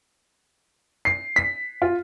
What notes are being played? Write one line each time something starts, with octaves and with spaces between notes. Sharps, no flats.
C7
B6
F4